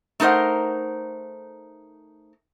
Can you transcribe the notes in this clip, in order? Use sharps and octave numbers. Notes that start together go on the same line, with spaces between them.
A3 D#4 A#4 C5 F#5